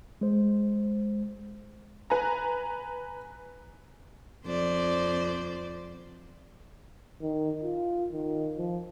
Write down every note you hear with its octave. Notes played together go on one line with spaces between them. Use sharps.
G#3 C5
B4 G#5 A#5
F2 C5 D5
D#3
F4
D#3
F3